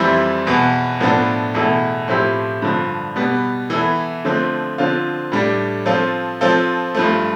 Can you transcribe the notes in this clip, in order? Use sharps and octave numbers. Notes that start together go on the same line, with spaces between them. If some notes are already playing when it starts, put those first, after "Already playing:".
Already playing: F2 E3 G3 C4 E4
E2 B2 B3
A2 F3 B3 D4 A4
E2 B2 A3 E4 A4
A2 F3 C4 E4 G4
G2 D3 F3
B2 G3 B3
E3 B3 E4 A4
D3 F3 A3 C4
D3 F3 C4 F4
A2 G3 D4
F3 C4 F4 A4
F3 C4 F4 A4
G2 F3 A3